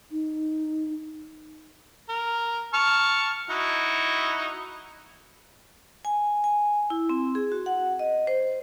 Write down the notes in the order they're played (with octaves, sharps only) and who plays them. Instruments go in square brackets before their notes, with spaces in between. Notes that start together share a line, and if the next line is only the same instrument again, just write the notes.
[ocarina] D#4
[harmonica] A#4
A5 C#6 F6
D#4 E4 F#4
[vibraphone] G#5
G#5
E4
C4
G#4
F#4
F#5
D#5
C5